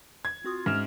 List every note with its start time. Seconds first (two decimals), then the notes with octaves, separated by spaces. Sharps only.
0.25 G#6
0.44 C4 F4 F#4 D#6
0.66 G#2 C#4 E5 F6 E7